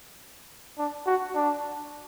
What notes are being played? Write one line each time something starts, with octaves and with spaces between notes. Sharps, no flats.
D4
F#4
D4